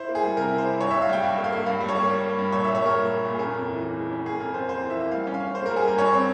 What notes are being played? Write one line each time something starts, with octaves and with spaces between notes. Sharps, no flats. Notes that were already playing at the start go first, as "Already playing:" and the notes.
Already playing: E4 C5
A#3
G#4
G3
C3 A#4
E4
C5
E4
G2 C#5
E5
G2
F5
G3 G5
G2 F5
A#3
F5
A#3
G2 F5
G3
C#5
A#3
G3
A#3
G2
A#2 C#5
E5
A#3
C#5
G3 A#4
A#2
A#2
A#2
G#4
C#4 A#4
F2
E3
E3
G#3
C#4
A#3 G#4
F2 A#4
F2 C5
A#3 C5
E3
E5
A#3
G3 F5
C#4
F5
C#4
A#3 C5
A#4
G3
G#4
A#3 A#4
G2 C#5
C4